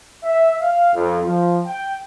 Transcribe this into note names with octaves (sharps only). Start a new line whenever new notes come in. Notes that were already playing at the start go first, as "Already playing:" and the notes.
E5
F5
F2
F3
G5